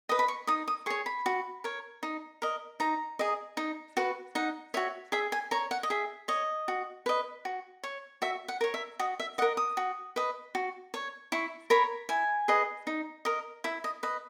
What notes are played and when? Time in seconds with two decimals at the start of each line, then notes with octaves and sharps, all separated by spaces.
0.09 B4 D#5 D#6
0.19 B5
0.28 C#6
0.47 D#4 D#6
0.68 D#6
0.86 G#4 C#5 C#6
1.06 B5
1.26 F#4
1.64 A#4 C#5
2.03 D#4
2.42 A#4 D#5
2.80 D#4 A#5
3.19 G#4 D#5
3.57 D#4
3.97 F#4 B4
4.35 D#4 F#5
4.74 F#4 C#5 E5
5.12 G#4 E5
5.32 G#5
5.51 C#5 A#5
5.71 F#5
5.83 D#5
5.90 G#4 E5
6.28 C#5 D#5
6.68 F#4
7.06 B4 D#5
7.45 F#4
7.84 C#5
8.22 F#4 E5
8.48 F#5
8.61 A#4 C#5
8.74 E5
8.99 F#4 D#5
9.20 E5
9.38 D#5 F#5
9.42 A#4
9.57 D#6
9.77 F#4
10.16 B4 D#5
10.55 F#4
10.94 C#5
11.32 E4 C#6
11.70 A#4 C#5 B5
12.09 E4 G#5
12.48 G#4 B4 D#5
12.87 D#4
13.25 A#4 D#5
13.64 E4 E5
13.84 D#5
14.03 B4 D#5